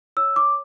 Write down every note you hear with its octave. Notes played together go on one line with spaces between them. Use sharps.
C#5 E6
D6